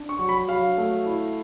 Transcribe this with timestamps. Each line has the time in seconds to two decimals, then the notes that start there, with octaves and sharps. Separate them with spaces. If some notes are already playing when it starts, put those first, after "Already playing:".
Already playing: D4
0.09 C#6
0.19 F#3
0.29 B5
0.48 F#3 F5
0.78 A3
1.06 E4